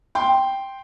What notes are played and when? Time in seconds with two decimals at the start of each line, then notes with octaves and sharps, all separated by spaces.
0.15 G5 C6